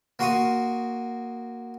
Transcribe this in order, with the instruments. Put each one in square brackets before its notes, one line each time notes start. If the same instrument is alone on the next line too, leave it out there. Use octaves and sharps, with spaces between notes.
[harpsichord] A#3 F#4 C6 C#6 D#6